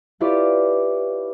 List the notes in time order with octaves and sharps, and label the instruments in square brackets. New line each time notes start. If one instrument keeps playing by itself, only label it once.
[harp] E4 F4 G4 B4 C#5 D5